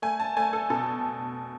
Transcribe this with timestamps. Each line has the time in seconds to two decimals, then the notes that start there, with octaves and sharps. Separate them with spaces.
0.02 A3 G#5
0.20 A5
0.37 A3 G#5
0.53 A4
0.70 B2 A4